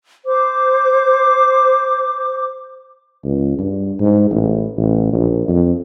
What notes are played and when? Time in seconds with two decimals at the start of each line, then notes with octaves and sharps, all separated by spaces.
0.25 C5 D6
3.24 C#2
3.58 G2
3.99 G#2
4.31 A1
4.77 A1
5.13 A#1
5.48 F2